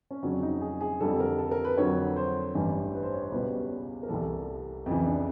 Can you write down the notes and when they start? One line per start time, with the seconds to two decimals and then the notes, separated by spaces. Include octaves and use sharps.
0.11 C#4
0.23 F2 C#3 F#3 D4
0.42 D#4
0.61 G#4
0.81 G#4
1.00 F2 D3 G3 A4
1.20 A#4
1.38 A4
1.51 A#4
1.65 B4
1.77 F2 D3 F#3 C#5
2.16 C5
2.55 A1 G2 E3 G3
2.94 B4
3.03 C5
3.13 C#5
3.23 C5
3.32 C#2 B2 G3 B4
4.03 A#4
4.09 C2 C3 E3 G3 A4
4.86 F2 C#3 E3
5.06 D4